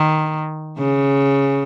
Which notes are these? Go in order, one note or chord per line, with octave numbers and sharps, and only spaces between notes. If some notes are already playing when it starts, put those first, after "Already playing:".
Already playing: D#3
C#3